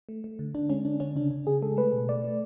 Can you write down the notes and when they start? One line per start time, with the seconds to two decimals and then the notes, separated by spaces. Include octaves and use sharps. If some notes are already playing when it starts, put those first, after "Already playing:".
0.09 A3
0.24 A3
0.39 D3
0.54 D3 D4
0.69 G#3 C#4
0.85 D3 D4
1.00 D3 C#4
1.16 C#3 D4
1.31 C#3
1.47 C#3 G#4
1.62 G#3 A4
1.77 A3 B4
1.93 B2
2.09 A3 D5
2.24 A3